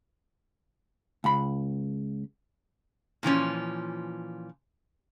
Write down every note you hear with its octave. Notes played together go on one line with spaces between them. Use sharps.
C#2 B5
A#2 E3 F3 C#4